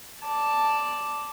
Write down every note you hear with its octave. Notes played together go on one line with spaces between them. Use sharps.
D5 A5